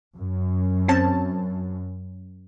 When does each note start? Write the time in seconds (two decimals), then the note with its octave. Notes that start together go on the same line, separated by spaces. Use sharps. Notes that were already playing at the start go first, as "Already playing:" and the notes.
0.18 F#2
0.88 C4 C#4 A5